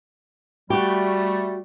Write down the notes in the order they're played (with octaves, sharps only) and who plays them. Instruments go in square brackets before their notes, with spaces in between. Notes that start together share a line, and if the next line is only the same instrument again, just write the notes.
[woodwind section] G3 A3 [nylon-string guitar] F#4 G4